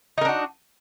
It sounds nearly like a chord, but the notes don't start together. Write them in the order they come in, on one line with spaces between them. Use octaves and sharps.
D#4 A#4 D4 F#4